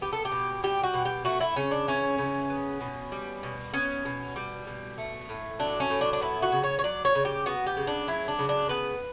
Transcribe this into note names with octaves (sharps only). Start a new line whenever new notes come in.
B3 G4
A4
G4
B2
G3 G4
F#4
B2
G4
A3 F#4
E4
C#3 C#4
D4
E3 C#4
C#3
B3
B2
G3
B2
B3 C#4
B2
G3
B2
A3
A2
F#3 D4
C#4
A2
D4
D4
B3 E4
F#4
C#3
C#5
C#5
F#3 D5
C#5
C#3
G4
B3 F#4
G4
C#3
D4
F#3 E4
D4
C#3
D4
B3 B4